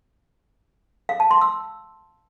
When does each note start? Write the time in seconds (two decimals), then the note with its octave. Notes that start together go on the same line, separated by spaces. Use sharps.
1.09 F5
1.20 A5
1.31 C6
1.41 E6